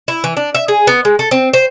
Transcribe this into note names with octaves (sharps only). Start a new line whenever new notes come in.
E4
E3
D4
E5
G#4
B3
G#3
A4
C4
C5